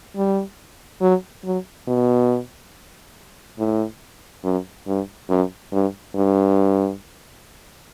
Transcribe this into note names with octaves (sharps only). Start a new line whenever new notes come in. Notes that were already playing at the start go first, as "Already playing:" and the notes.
G3
F#3
F#3
B2
A2
F#2
G2
F#2
G2
G2